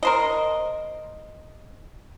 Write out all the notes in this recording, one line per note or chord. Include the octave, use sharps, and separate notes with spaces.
A#4 C5 D#5